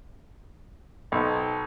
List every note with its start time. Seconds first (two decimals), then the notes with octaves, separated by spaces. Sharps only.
1.12 B1 C4 D#4 A5